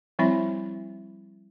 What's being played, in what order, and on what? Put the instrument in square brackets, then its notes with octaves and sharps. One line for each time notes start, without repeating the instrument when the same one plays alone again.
[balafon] F3 G3 C4 E4 E5 B5